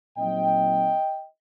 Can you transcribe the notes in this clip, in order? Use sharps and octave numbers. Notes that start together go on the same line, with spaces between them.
A#2 F#3 C4 D#4 D#5 G5